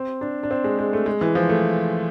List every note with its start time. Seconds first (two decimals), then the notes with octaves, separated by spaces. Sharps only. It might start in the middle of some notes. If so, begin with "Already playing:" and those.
Already playing: C4
0.21 D4
0.43 D4
0.51 C4
0.64 G#3
0.79 G#3
0.93 A3
1.06 G#3
1.21 E3
1.35 F3
1.49 A3